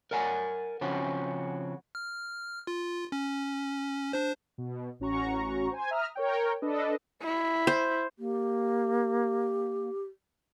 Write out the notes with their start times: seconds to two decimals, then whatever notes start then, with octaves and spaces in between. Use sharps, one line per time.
0.11 A#4 D5 F#5 G#5
0.81 C#3 F3 C4 C#4 F#4
1.95 F6
2.67 F4
3.12 C#4
4.13 D4 C5
4.58 B2
5.00 A1 C#4 F#4 A#5 C#6
5.70 C5 G#5
5.91 E5 A#5 D#6 F6
6.15 A#4 C#5 G5
6.62 D4 A4 B4 D#5
7.22 E4
7.67 C5
8.19 A#3 G4